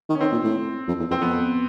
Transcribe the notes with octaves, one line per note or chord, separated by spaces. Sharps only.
D#3
C#4
D#3 C4
A#2
A2
F2
E2
F2 C4
F2 B3